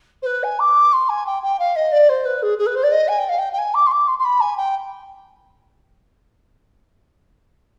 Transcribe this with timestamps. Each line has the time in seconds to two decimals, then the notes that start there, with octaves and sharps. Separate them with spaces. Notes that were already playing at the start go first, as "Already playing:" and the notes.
0.22 C5
0.26 B4
0.43 G#5
0.59 D6
0.93 C6
1.09 G#5
1.26 G5
1.43 G5
1.59 F5
1.76 D#5
1.92 D5
2.09 C5
2.25 B4
2.42 G#4
2.58 G#4
2.66 B4
2.75 C5
2.83 D5
2.91 D#5
3.08 G#5
3.18 G5
3.29 F5
3.38 G5
3.52 G5
3.58 G#5
3.74 D6
3.87 C6
3.91 D6
4.08 C6
4.18 C6
4.24 B5
4.40 G#5
4.57 G5